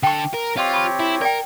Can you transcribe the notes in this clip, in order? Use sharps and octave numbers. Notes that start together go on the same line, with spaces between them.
D3 A4 G5 C#6
A#4
C4 F4 G4 C#5 D#5 C#6
B5 C#6
E4
A#4 D5 G5